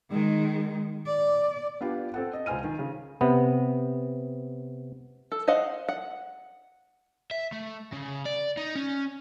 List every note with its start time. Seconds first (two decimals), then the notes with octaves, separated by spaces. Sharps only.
0.11 D#3 G#3
1.06 D5
1.81 B3 D4 F4 G4 B4
2.14 C4 A4 F#5
2.33 D#5
2.46 C#2 F4 C5 G#5 F6 D#7
2.64 D#3
2.79 C#3
3.21 C3 B3
5.32 A4
5.48 C5 D#5 F5 F#5
5.89 F#5
7.31 E5
7.52 A3
7.92 C#3
8.25 D5
8.57 D#4
8.75 C#4